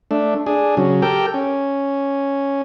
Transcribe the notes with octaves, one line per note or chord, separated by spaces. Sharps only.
A3 D4
D4 G#4
C#3 F#3
G4 A4 A#4 G5
C#4